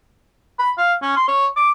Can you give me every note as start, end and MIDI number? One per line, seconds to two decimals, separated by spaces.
0.59 0.71 83
0.77 0.93 77
1.02 1.15 61
1.16 1.24 84
1.28 1.47 73
1.56 1.70 86